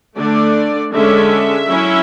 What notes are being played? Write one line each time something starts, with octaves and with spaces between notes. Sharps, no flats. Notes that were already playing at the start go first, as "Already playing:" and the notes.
D3 A3 D4 D5
D3 G#3 C#4 E5
F#3 C#4 E4